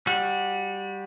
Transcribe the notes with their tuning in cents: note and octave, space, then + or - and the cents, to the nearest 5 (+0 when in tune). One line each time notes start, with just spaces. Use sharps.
G3 +0 F#4 -20